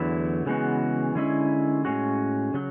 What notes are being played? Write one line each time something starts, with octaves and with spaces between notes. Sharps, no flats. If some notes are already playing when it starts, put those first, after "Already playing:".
Already playing: E2 D3 F#3 A3 E4
C#3 E3 G#3 B3 F#4
D3 G#3 C#4 E4
A2 G#3 C#4 F#4
C#3 F#3